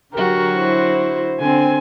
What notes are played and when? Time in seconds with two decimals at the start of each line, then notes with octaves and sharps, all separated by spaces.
0.14 D3 F#3 F#4 G4 A#4
0.57 E4 C5
1.40 D3 C4 G#5